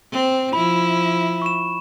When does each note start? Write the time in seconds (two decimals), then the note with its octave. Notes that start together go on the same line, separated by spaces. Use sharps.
0.12 C4
0.53 F3 E4 B5
1.42 C#6 E7